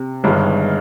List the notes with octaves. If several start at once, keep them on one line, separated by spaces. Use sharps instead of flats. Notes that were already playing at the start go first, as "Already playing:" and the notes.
Already playing: C3
G1 G2 D#3 G#3